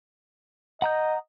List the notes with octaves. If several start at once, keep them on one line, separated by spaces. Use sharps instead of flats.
D#5 F#5 A#5 G6